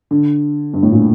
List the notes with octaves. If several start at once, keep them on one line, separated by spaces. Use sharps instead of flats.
D3
G2
A2
A#2